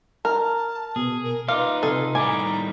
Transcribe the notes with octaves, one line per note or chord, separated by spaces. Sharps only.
A#4 A5
B2 G#4
A#4
D#4 F4 B4 F5 D6
C3 G#4 A4
A2 D#3 G3 G#5 A#5 D6